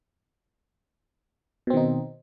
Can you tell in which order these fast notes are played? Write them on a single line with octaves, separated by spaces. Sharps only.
B2 C4 D#3 D#4